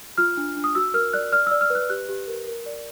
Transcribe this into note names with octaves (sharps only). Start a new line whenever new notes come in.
F4 F6
D4
D4
D#6
F#4 E6
A#4 F6
D5 F#6
D5 F6
D5 E6
F6
B4
F#6
G4 F#6
G4
A#4
A#4
D5